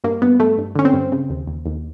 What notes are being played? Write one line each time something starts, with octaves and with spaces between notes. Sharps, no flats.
G2 A#3
G2 B3
G2 A3
G2
D3 C#4
C4
G2
C#3
D#2
D#2
D#2